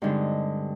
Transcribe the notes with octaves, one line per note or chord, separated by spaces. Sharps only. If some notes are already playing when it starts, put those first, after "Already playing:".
G2 D3 G#3 C4 D#4